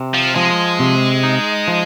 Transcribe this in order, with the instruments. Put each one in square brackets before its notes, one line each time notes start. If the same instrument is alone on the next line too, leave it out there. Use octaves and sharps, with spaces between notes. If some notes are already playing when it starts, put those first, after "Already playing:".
Already playing: [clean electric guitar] C3
[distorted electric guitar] F3
[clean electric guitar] F3 [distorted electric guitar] G#3
[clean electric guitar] C3
D#4
F3